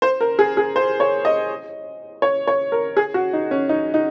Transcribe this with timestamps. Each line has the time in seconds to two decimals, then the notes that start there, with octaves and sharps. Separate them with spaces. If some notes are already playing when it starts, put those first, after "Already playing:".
0.02 C5
0.21 A#4
0.39 G#4
0.57 G#4
0.76 C5
1.00 C#5
1.25 D#5
2.22 C#5
2.47 C#5
2.72 A#4
2.97 G#4
3.14 F#4
3.33 D#4
3.51 C#4
3.69 D#4
3.94 D#4